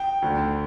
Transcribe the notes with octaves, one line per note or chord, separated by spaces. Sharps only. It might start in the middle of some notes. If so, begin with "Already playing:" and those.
Already playing: G5
D2 D3